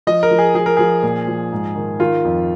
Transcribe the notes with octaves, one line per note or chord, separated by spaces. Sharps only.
F3 D#5
A#4
F3
G#4
F3 G#4
A#4
F3 G#4
A#2
F3
G#2
D#3
D#3 F4
F2